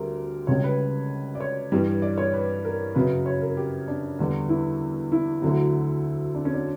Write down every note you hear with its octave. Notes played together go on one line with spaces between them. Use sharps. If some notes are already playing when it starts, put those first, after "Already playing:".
Already playing: D2 D3 G3 G4 A#4
C#2 C#3 G3 C#5
B4
D5
C#5
G2 E3 G3
D5
C#5
B4
A#4
F#2 C#3 F#3 B4
C#5
A#4
G4
D4
E2 D3 G3
E4
E4
D2 D3 F#3
D4
C#4
D4